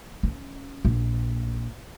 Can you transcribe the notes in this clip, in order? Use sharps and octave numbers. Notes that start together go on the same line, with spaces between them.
C#4
A#1